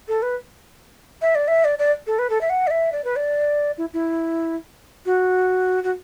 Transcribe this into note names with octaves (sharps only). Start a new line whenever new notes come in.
A4
B4
E5
D5
E5
D5
D5
A4
B4
A4
E5
F#5
D5
E5
D5
B4
D5
E4
E4
F#4
F#4